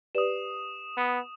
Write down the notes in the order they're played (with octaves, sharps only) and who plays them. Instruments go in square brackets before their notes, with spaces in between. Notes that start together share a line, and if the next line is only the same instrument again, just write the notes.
[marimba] G4 B4 D5 [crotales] D#6 E7
[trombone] B3